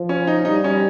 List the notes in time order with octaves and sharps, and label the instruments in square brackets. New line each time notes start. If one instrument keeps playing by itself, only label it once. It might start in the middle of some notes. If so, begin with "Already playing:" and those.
Already playing: [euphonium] F3
[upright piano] C#4
D#4
[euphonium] G3 [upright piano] D#4
[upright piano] C#4